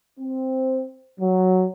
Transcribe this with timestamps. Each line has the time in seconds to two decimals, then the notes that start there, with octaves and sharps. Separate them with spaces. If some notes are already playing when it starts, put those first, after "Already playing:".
0.19 C4
1.20 F#3